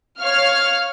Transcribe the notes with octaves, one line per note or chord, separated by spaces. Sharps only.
C#5 F5 F6